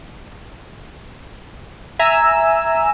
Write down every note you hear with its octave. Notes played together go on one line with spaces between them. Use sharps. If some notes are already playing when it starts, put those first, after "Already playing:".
E5 G#5 A#5 E6